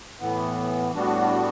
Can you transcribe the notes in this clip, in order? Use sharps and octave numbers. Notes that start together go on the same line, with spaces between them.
A2 E3 B3
A2 G3 B3 D4 F#4